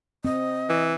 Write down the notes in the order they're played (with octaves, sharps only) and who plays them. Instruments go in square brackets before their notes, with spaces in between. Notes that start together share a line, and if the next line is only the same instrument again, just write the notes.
[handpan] C4 [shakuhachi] D#5
[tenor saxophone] E3